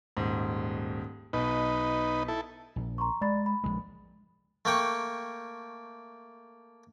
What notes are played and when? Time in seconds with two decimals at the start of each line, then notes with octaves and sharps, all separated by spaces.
0.17 D#1 G#2
1.33 B1 D#4 B4
2.28 E4 A4
2.76 A#1
2.98 A#5 C6 C#6
3.21 G#3 D5 B5 A6
3.46 B5
3.64 A#1 E2 G#3
4.65 A3 A#3 G5 C#6